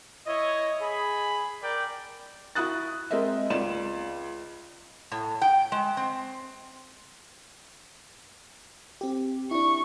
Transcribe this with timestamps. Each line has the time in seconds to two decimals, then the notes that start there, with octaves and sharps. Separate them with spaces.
0.27 E4 C#5 D#5
0.81 G#4 B5
1.63 A#4 D5 G5
2.55 E4 F#4 D#6 F#6 A6
3.11 G#3 C4 A#4 D#5 E5
3.50 C#2 D5 E7
5.12 A2
5.42 G5
5.72 G#3
5.97 C4
9.01 C4 G4
9.51 D4 E4 C#6